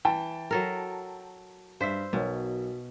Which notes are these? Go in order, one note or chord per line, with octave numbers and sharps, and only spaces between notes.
E3 G5 A5
F#3 A4 A#4
G2 C5 E5 B6
B1 B2 A#4 C#5